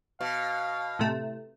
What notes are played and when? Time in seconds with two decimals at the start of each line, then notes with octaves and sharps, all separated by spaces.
0.21 B2 F5
0.99 A2 C3 A3